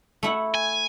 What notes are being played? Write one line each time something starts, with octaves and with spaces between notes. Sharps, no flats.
A3 E4 F#5
G#5